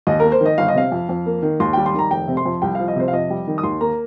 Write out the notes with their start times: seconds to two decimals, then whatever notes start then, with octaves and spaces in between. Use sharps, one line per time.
0.07 D#2 D#5
0.20 A#3 A#4
0.32 C5
0.41 D#3 D#5
0.58 G1 F5
0.68 D#5
0.75 C3 F5
0.92 F2
1.09 F2
1.26 A#3
1.43 D#3
1.60 D#2 C6
1.73 G3 G5
1.86 C6
1.94 D#3 A#5
2.11 F1 G5
2.28 C3
2.37 C6
2.45 F2
2.62 C2 G5
2.75 F3 F5
2.88 D#5
2.96 C3 C5
3.08 F5
3.13 F2 D#5
3.30 G3
3.47 D#3
3.58 D#6
3.63 D#2 C6
3.81 A#3 A#5